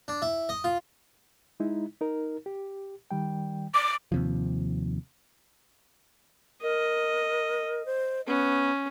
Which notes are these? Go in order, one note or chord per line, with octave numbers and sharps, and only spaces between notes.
D4
E4
D#5
F4
G#3 D#4 E4
D#4 A#4
G4
D#3 G3 G5
D6
D#2 C3 F3
A#4 D#5
C5
B3 C#4